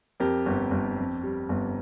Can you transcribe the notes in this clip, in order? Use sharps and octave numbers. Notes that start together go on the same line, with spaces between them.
F2 G4 A#4
G1
G1
F2
G3
G1